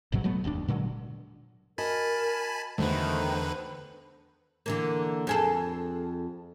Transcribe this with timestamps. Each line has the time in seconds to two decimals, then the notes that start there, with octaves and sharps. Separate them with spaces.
0.12 A1 G#2 B2 F#3
0.24 F#3 G#3 A3 B3
0.44 F1 D#2 C#4 D4
0.68 A#2 D3 F#3 G#3
1.78 F#4 A#4 D#5 G#5 A5 B5
2.78 E2 D3 D#3 A3 F#4 B4 C5
4.66 D3 E3 A#3
5.27 F2 G#4 A4